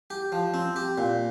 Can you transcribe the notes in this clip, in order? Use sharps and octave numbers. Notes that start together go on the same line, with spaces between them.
G4
F3
C4
G4
A#2